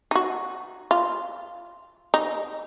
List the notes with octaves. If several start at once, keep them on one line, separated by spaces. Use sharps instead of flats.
D#4 F#4
F4
D#4